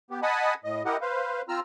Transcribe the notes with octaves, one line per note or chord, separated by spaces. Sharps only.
B3 G4
D#5 F#5 G#5 A5 B5 D#6
A2 D#5
E4 G4 A#4 D#5 F#5
B4 C5 F5
C4 F4 A#5 E6 F6